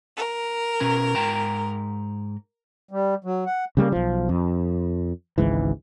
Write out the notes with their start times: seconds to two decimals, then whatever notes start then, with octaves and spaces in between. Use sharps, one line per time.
0.17 A#4
0.80 B2 C#4 A#5
1.15 G#2 G5 A#5
2.91 G3
3.24 F#3
3.46 F#5
3.77 C#3 G3 G#3 A#3
3.92 B1 F3
4.29 F2
5.38 G#1 C#2 G#2 E3